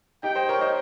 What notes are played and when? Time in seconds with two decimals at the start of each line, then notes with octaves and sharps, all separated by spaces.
0.23 D#4 G4 G5
0.36 C5 D#5
0.49 A#4 C#5
0.61 C5 D#5